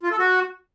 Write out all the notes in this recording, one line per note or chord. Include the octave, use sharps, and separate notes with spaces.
F4
A4
F#4